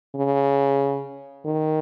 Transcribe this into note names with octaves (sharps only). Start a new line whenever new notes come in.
C#3
D#3